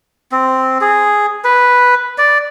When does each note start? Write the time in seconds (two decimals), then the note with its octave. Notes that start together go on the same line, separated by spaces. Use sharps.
0.32 C4
0.81 G#4
1.45 B4
2.18 D5